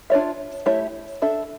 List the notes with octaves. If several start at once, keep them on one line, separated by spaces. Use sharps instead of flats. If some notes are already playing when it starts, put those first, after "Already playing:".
D4 F4 C#5 E5
A3 E4 G4 C#5 E5
D4 A4 E5